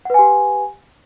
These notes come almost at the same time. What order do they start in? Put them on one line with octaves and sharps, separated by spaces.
F#5 B4 G#5 G4